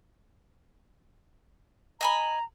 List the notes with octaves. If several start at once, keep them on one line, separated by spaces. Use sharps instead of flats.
D#5 G#5 A#5 B5